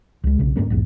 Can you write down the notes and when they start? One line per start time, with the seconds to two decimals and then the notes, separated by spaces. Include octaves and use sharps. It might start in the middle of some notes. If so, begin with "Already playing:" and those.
0.24 C#2 G#3
0.39 B1 C#3
0.56 G2 A3 A#3 C#4
0.70 B1 E2 G#2